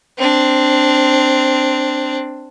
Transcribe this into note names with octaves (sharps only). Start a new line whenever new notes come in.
C4 D4